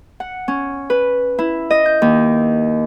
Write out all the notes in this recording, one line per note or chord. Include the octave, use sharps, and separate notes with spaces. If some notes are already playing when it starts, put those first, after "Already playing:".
F#5
C#4
B4
E4
D#5
G6
D#2